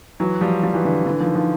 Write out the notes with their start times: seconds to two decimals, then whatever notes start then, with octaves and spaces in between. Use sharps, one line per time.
0.20 E3 F#3
0.41 F3 G3
0.63 F3 G3
0.74 E3 F#3
0.85 D3 E3
1.06 D3 E3
1.20 D#3 F3
1.35 D#3 F3